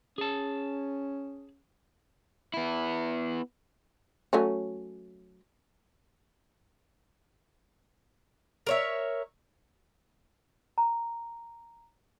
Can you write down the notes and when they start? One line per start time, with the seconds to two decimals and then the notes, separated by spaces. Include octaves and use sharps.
0.18 C#4 G#4 A5
2.54 B3 E4
4.33 F#3 A3 C#4
8.67 A#4 C#5 E5
10.78 A#5